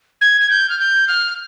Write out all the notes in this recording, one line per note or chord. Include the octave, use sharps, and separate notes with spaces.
G#6
G#6
G6
F6
G6
F6